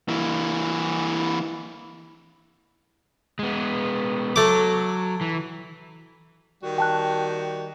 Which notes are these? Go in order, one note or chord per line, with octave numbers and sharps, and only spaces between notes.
E3 A#3
G#3 B3
F#3 A3 D6
E3
D#3 G3 F#4
G5 A5 F#6